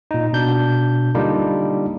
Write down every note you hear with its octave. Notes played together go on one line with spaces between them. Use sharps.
A#2 D#4
B2 D4 G6
D3 G3 A#3 D4 D#4 F4